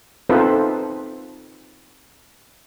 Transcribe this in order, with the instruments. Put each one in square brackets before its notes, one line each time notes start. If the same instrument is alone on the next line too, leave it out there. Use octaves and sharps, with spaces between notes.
[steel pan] C4 D#4 F4 A4 B4 C5